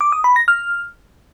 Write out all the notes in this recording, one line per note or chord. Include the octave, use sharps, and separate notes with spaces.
D6
D#6
B5
A#6
F6